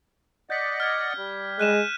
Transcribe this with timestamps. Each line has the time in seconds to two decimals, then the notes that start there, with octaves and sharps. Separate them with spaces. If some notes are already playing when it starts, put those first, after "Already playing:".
0.50 D5 D#5 F#5 G6 B6
0.80 F6 G#6
1.17 G3
1.60 G#3 F#6 D#7 E7